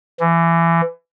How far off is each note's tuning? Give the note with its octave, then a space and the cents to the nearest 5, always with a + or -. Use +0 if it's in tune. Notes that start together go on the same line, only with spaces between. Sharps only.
E3 +25